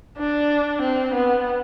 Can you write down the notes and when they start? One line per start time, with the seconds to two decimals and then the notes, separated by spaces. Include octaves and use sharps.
0.18 D4
0.82 C4
1.14 B3